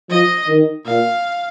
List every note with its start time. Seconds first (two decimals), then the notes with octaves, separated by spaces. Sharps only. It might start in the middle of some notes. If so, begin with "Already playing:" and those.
0.10 F3 D#5
0.48 D#3
0.86 A#2 F5